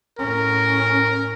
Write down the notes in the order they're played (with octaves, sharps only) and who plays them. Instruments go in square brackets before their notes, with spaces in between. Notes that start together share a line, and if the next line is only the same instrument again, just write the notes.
[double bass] A2 C#4 [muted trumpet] A#4